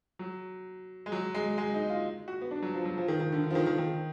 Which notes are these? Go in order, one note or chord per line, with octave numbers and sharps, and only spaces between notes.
F#3
G#3
F#3
G#3
G#3
D#4
F4
F#4
B3
D4
F#3
F3
F#3
F3
D#3
D#3
D3
D3
F3
D#3
D#3
D#3